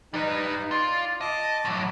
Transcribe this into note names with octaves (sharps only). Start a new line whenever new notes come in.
G3 D#4 B4
F4 D5
D#5 A5 D6
A2 F#3